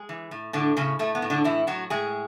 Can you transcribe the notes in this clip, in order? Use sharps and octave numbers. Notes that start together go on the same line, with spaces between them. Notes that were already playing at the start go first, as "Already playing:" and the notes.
Already playing: G#3 G#4
E3
A2
A2 D3 D4
A2 C#3 C#4
A2 A3
B3
A2
D3 D4
A2 E3 E4
A2 F#3 F#4
A2 G#3 G#4